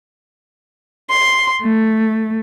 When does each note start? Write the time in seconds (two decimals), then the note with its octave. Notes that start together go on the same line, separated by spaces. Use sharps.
1.10 C6
1.62 A3